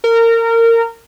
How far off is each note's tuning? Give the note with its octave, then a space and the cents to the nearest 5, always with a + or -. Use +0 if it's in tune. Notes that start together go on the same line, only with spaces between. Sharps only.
A#4 -25